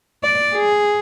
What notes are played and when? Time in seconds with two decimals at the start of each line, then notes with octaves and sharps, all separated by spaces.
0.23 D5
0.55 G#4